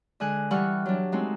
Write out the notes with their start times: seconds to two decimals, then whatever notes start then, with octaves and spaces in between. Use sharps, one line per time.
0.20 D3 G#3 G#5 F#6
0.51 E3 G3 F#5 C#6 F6 F#6
0.86 F#3 D4
1.12 G#3 A3 C4 D#4 F#4